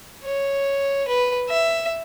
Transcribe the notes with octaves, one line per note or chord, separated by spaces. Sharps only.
C#5
B4
E5